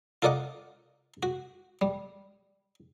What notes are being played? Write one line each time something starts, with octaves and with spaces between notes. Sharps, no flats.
F4 A4 A#4 D5 D#5 F#5
F#4
G3